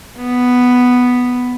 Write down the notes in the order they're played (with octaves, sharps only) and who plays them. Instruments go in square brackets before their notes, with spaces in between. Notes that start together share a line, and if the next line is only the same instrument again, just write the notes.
[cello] B3